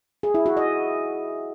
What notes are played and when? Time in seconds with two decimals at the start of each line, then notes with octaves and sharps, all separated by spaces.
0.23 G#4
0.34 E4
0.46 F#4
0.57 D#5